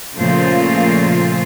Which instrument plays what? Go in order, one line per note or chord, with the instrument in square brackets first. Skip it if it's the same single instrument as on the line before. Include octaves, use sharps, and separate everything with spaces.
[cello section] A#2 C#3 F3 A3 F4 C5